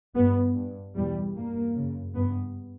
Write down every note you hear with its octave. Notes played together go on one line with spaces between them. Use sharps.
G2 B3
G2
E2 B2 G3
G2 A#3
F#2 C#3
G2 B3